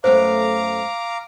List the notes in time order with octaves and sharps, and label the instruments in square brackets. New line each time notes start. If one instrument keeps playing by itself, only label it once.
[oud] F#2 A3 B3 [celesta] C5 [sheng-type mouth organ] F5 A#5 D6